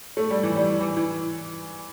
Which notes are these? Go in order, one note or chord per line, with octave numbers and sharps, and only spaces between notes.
A3
G3
E3
G3
E3
E3